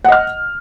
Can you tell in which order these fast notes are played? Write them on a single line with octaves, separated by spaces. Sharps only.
F#5 D#5 F6